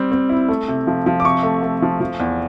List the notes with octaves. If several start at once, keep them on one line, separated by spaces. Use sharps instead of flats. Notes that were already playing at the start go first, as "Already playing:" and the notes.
Already playing: G3 C4
C4
E4
A3
C3
F3
F3
D6
C3 C#6
A3
A3
F3
F3
E2